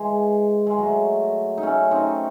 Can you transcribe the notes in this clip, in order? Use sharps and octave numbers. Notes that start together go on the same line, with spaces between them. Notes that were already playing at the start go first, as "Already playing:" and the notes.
Already playing: E3 G#3
G#3
F#3 A3
D#4
A3 C#4
C4 D#4